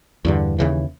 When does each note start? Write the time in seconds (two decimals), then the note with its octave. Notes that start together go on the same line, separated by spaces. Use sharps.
0.25 E2 G2 D3
0.59 D#2 C#3 E3